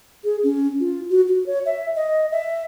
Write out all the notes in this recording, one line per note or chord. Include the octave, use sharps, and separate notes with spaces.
G#4
C#4
F4
F#4
F#4
C#5
E5
D#5
E5